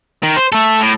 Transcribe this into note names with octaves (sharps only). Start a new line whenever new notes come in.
D#3
C5
A3 A4
A2